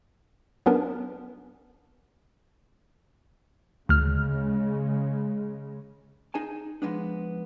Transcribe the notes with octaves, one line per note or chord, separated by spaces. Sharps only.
F#3 B3 C#4 D4 A#4 B4
D2 C#3 G#3 F6
D#4 G#4 G#5 A5
F3 G#3 B3 D4